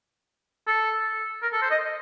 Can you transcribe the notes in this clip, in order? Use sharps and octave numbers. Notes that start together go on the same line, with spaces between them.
A4
A#4
A4
C5
D#5